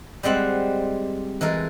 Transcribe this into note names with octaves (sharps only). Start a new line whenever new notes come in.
G3 G#3 C4 F#5
E3 G#3 A4 A#4